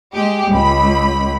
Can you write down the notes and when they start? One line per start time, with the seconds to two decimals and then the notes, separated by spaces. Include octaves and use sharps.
0.13 G#3 G4
0.50 C#2 B5